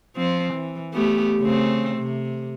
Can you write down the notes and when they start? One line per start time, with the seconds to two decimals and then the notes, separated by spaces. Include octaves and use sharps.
0.16 F3 C4
0.54 E3
0.94 A3 B3 G4
1.40 C#3 A3 C4
1.98 C3